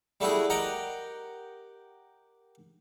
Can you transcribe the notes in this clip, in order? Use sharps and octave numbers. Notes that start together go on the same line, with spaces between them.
G3 A3 B3 E4 F#4 G#4
G4 A#4 D#5 F#5 G5